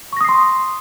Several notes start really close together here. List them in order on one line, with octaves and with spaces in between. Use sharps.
C#6 A#6 D#6 C7 C6